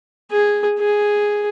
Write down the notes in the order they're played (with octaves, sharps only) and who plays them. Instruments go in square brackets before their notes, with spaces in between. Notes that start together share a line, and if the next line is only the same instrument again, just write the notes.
[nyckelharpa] G#4
G#4